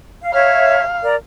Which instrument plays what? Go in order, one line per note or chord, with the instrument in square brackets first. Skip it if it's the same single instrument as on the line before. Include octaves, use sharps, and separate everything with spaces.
[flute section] F5
[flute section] C#5 E5 [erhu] F5
[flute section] A#4 D5